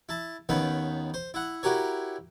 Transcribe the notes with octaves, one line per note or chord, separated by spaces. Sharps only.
E4 A5
D#2 D#3 B3 C#4 B5
C5
E4 F#5
E4 F#4 G4 A#4 C#5